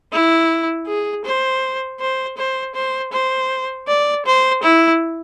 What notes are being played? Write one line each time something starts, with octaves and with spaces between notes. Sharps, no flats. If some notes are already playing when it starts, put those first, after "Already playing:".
E4
G#4
C5
C5
C5
C5
C5
D5
C5
E4